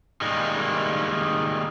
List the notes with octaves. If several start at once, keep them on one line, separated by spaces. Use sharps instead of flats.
D#3 G3 G#3 A#3